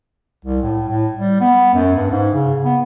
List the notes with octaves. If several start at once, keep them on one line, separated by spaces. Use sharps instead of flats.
C2
A2
A2
G3
B3
F#2
G2
G#2
C#3
B3